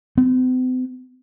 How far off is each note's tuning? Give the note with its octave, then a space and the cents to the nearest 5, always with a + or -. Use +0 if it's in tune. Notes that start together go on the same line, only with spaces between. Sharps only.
C4 -45